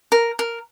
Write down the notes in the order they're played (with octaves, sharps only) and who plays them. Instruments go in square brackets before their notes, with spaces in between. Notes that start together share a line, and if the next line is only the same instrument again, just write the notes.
[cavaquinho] A#4
A#4